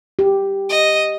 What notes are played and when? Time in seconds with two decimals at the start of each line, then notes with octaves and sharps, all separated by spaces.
0.19 G4
0.70 D#5